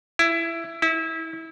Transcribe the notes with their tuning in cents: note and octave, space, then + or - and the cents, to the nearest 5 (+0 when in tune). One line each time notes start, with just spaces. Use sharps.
E4 +15
E4 -25